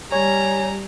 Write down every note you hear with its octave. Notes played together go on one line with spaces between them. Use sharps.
G3 C#5 G#5 A#5